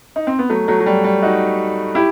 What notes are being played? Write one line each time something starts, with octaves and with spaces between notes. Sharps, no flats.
D#4
C4
B3
F#3 A3
F#3 A3
F#3
G3
G3
D#4 F#4
E4 G4